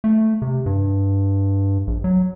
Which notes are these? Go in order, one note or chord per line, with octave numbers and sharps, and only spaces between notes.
A3
C3
G2
A#1
F#3